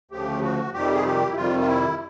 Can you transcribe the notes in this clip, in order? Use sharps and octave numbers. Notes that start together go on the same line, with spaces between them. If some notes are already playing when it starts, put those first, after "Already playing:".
D2 C#3 F3 A3 G4
F#4
F2 C3 D#3 G3 G4
G#4
G4
E4
F2 C3 D#3 G3 F4
F4
E4